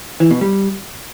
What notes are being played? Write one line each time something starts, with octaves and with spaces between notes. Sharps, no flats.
E3
B2
G3